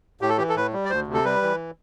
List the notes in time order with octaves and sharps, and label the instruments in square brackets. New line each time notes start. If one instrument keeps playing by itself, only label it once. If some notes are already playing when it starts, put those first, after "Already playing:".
[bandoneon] A2 G4
A4
E3 G4
A4
A2 B4
G3
D5
D2 C5
C3
A4
G3 B4
E3